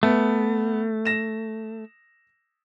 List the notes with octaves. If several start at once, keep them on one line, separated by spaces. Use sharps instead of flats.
A3 B3
A#6 E7